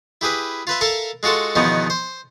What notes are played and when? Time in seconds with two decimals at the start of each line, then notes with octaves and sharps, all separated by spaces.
0.21 E4 G4 G#4 B4
0.67 F4 B4 E5
0.81 A4 A#4 E5 F5 A5
1.23 G#3 F4 F#4 A4 A5
1.55 E2 B2 D#3 F3 B3 C#4
1.90 C5